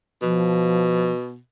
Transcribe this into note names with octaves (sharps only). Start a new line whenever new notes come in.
B2 F3